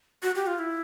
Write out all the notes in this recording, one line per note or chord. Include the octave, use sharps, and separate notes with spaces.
F#4
G4
F4
E4